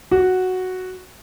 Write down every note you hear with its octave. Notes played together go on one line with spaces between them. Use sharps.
F#4